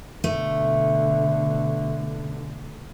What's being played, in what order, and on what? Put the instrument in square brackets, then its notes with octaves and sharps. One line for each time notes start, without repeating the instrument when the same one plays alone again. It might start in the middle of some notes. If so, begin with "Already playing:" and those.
[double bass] B2 D3 [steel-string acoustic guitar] A3